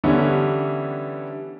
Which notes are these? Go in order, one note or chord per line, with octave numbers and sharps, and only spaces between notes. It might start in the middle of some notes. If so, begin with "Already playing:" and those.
D3 E3 G3 B3 C#4